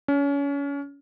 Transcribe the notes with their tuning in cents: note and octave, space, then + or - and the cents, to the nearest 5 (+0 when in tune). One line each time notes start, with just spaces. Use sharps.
C#4 +30